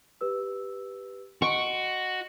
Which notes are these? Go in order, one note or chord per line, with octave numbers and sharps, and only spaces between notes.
G4 B4 E6
F#4 D#5 C6 C#6 D7